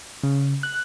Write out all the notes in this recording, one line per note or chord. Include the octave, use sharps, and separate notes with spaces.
C#3
F#6